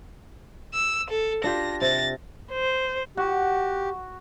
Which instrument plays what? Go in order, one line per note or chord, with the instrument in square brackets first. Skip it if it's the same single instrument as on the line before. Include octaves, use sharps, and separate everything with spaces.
[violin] E6
A4
[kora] D4 F4 G4 [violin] A#6
[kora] C3 [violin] A6 A#6
[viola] C5
[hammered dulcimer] F#4 [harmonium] G4